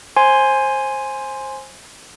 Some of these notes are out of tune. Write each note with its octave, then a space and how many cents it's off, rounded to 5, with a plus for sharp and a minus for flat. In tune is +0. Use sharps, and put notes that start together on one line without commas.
C5 +20 G#5 +0 C6 +0